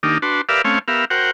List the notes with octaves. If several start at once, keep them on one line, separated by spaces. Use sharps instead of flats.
D#3 A#3 D4 D#4 G4
D4 F#4 B4 A5 C6
G4 A#4 B4 D5 E5 F5
A3 C4 C#4 C#5 F5
B3 G4 A#4 E5 F5
F#4 A#4 C5 F#5 G5